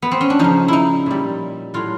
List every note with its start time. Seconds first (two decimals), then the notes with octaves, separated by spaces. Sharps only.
0.02 B3
0.11 C4
0.21 C#4
0.30 D4
0.39 C#3 F3 D#4
0.68 D#4 E4
1.06 A#2 G3
1.74 A2 F#3 F4